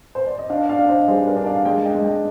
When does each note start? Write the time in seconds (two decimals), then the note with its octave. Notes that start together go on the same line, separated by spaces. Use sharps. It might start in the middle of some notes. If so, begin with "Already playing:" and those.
0.15 C5
0.27 D5
0.38 D#5
0.50 D4 D5 F5
0.69 D5 F5
0.79 D4
0.88 C5 D#5
1.07 G3 G#4 C5
1.27 A#4 D5
1.36 D4
1.46 D5 F5
1.65 G#3 D#5 G5
1.85 D#5 G5
1.95 G#3
2.04 D#5 G5